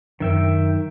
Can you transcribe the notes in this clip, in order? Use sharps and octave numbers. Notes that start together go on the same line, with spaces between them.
F#2 D#3 E5 G5